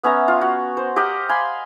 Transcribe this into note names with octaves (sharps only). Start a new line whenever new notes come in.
B3 C#4 E5 A#5
F4
F#4
C5
G4 A#4 D#5 F#5
F5 G#5 B5 C6